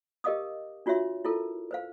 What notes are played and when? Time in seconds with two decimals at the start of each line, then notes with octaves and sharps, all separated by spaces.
0.24 G4 A#4 D#5 F5 D6 D#6
0.86 D4 F4 F#4 C#5 E5 C6
1.25 E4 F4 A4 A#4
1.71 B4 C5 F5